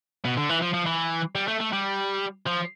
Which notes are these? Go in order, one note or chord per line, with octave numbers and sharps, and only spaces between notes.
B2
D3
E3
F3
F3
E3
G3
A3
A3
G3
F3